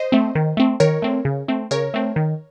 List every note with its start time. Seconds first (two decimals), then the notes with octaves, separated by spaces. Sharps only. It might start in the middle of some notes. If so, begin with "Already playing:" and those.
Already playing: C5 D#5
0.12 A3 C4
0.35 D#3
0.57 A3 C4
0.80 D#3 A#4 C#5
1.02 A3 C4
1.25 C#3
1.48 A3 C4
1.71 C#3 A#4 C#5
1.94 A3 C4
2.16 D#3